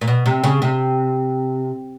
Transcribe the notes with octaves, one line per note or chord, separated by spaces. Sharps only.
A#2
B2
C3
C#3
C3